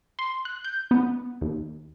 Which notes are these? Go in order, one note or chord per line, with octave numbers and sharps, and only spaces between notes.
C6
F#6
G6
B3
D#2